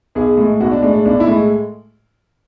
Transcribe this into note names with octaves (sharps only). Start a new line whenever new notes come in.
B1 G#4
A2 G#3
B1 F#4
D4
A2 G#3 D4
D4
B1 D4
E4
A2 G#3